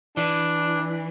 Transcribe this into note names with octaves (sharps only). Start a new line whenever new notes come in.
E3 D4